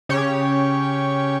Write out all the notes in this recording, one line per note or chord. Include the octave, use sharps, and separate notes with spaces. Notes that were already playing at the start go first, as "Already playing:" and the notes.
C#3 G4 C#5